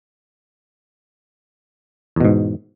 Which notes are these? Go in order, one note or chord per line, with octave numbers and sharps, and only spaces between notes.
E2 G#2 B2